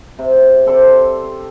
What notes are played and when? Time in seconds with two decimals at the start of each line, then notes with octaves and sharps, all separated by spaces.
0.19 C3
0.66 C4 A4 C5 D5